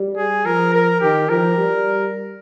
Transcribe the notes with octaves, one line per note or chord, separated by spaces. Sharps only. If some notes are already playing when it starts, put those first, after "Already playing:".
Already playing: G3
G#4
F3 A#4
A#4
D#3 G4
F3 A#4
G3